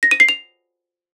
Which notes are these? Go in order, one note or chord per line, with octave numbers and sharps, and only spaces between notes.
A#6
D#7
C7
F7